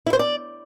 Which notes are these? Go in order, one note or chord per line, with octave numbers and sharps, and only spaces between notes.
E4
C5
D5